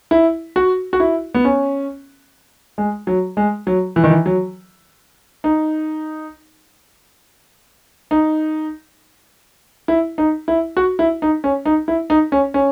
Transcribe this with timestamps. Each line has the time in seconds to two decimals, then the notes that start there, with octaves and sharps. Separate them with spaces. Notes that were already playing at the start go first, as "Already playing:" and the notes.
0.11 E4
0.56 F#4
0.93 F#4
1.00 E4
1.34 B3
1.45 C#4
2.78 G#3
3.07 F#3
3.37 G#3
3.67 F#3
3.96 E3
4.04 D#3
4.11 E3
4.26 F#3
5.44 D#4
8.11 D#4
9.88 E4
10.18 D#4
10.48 E4
10.77 F#4
10.99 E4
11.22 D#4
11.44 C#4
11.65 D#4
11.88 E4
12.10 D#4
12.32 C#4
12.54 C#4